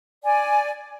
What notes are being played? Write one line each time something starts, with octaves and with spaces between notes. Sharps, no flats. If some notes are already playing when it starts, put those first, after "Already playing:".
D5 G#5